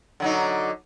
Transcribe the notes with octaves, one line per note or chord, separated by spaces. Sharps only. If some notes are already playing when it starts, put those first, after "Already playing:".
D3 F#3 D#4